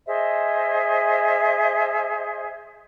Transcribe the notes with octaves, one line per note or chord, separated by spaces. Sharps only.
G#4 C5 D#5 E5